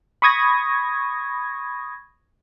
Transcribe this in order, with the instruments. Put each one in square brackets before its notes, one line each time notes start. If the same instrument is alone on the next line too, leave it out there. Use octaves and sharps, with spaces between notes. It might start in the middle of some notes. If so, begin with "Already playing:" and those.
[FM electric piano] B5 C#6 D#6 G#6 A#6